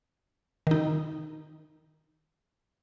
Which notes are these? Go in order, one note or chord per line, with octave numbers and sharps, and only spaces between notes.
D#3 D#4